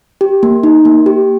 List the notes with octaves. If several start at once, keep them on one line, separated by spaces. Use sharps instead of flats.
G4
A#3
D#4
A#3
G4